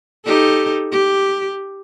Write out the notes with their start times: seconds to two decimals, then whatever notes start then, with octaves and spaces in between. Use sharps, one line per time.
0.25 D#4 G4 A4
0.92 G4